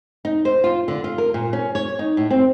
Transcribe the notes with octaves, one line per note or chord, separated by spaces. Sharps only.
D#4
C5
F4
D3
F4
A#4
A#2
C#4
C#5
D#4
A2
C4